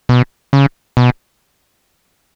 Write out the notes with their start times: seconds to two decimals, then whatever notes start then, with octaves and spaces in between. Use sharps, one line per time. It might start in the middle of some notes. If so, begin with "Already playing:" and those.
0.09 B2
0.53 C#3
0.97 B2